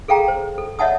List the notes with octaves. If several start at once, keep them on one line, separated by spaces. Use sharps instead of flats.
G#4 A4 F5 G5 A#5
C5
A4
C#5 D#5 E5 F#5 A5 D#6